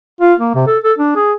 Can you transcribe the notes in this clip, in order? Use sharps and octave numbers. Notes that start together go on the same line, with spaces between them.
F4
A#3
C3
A4
A4
D4
G#4